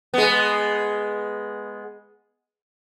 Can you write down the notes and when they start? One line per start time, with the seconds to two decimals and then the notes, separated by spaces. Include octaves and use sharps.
0.14 G#3 B3